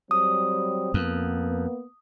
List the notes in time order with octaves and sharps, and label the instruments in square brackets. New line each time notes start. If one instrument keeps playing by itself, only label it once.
[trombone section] F#3 G3 C4 [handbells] D#6
[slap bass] F2 [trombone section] A#3 B3